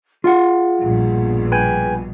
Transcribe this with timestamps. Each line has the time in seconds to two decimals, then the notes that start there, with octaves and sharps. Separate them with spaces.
0.24 F4 G#4 F5 F#5
0.81 A#1 G2 B2
1.52 B4 G5 G#5